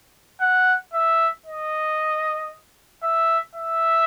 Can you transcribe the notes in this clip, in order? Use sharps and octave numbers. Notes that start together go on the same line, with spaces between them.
F#5
E5
D#5
E5
E5